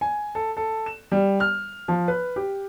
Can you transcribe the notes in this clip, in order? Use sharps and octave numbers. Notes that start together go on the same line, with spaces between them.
G#5
A4
A4
E7
G3
F6
F3
B4
G4